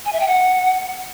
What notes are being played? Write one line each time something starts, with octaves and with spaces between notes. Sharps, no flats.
G#5
E5
G5
F#5